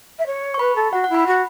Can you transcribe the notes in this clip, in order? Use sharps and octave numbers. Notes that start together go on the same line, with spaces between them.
E5
C#5
C#6
B4 B5
A4
F#4 F#5
E4 F#5
B5
F#4